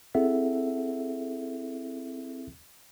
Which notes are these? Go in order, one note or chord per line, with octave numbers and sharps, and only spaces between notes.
C4 E4 G#4 A4 E5 F#5